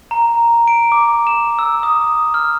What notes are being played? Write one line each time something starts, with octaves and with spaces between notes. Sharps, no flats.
A#5
D7
D6
E7
E6
D#6
F6